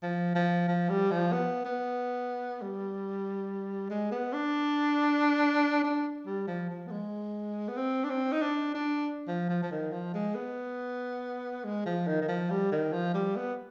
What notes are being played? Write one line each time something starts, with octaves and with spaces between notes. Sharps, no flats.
F3
F3
F3
G3
F3
B3
B3
G3
G#3
B3
D4
D4
G3
F3
F3
B3
G#3
B3
C4
D4
C4
D#4
D4
D4
F3
F3
F3
D#3
F3
G#3
B3
G#3
F3
D#3
D#3
F3
G3
D#3
F3
G3
B3